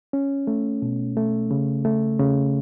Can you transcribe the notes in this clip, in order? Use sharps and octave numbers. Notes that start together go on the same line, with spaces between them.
C#4
A3
B2
A3
C#3
A3
C#3